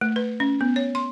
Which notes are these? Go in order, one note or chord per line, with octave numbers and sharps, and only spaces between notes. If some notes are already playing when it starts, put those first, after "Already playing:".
A3
B4
C#4
B3
C#5
C6